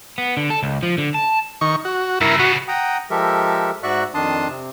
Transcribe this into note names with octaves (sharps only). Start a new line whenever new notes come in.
B3
D3
A4
C#2
F3
D3
A5
D#3 C#6
F#4
G2 C#3 E4 A#4
C#3 B3 F#4
F#5 G5 A#5 D#6
F3 G#3 G4 A4 A#4 E5
G#2 F#4 D5 E5 C#6 F#6
F2 D#3 D4 A5 C6 D#6
C3